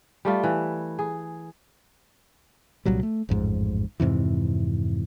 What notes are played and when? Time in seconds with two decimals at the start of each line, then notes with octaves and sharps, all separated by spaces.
0.25 G3 A3 F4
0.43 E3
0.99 G#4
2.85 C2 A#2 F#3 G3
3.03 A3
3.29 A1 F2 G#2
4.00 F2 G#2 C3 E3